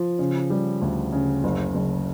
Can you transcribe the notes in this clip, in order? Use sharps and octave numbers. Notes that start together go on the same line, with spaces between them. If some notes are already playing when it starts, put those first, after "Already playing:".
Already playing: F3
C#3
G3
D2
C#3
F#1
F#1